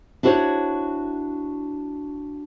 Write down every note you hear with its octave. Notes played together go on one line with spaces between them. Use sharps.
D4 E4 F#4 A4 C5 C#5